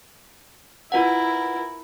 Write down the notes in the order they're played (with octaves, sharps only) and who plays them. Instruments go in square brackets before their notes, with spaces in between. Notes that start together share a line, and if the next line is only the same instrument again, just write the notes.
[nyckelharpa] E4 A#4 [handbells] F4 B4 F#5